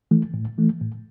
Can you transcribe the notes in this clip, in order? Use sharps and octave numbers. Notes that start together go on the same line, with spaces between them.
E3 A3
A2
E3 A3
A2